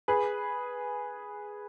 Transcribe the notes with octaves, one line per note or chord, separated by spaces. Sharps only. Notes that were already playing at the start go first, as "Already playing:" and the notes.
G#4 B4